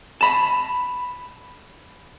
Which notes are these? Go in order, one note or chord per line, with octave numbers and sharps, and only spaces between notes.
A5 B5